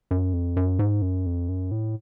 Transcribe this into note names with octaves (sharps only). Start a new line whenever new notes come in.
F#2
F2
F#2
G#2
F#2
F2
F#2
A2